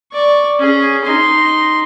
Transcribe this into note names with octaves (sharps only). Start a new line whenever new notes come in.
D5 C#6
C#4 G#4
D#4 C6